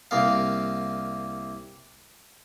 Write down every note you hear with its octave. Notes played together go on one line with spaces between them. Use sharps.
C2 A#3 F5